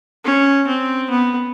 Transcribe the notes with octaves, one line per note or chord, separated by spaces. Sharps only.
C#4
C4
B3